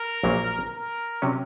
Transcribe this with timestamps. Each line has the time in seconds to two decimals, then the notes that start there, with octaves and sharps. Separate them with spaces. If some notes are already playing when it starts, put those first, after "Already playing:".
Already playing: A#4
0.23 A#1 A#2 F#3 A#3
0.73 A#4
1.22 C3 F#3 C#4